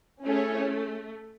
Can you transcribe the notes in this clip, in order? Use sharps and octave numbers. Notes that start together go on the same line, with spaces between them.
A3 C#4 E4 G#4 C#5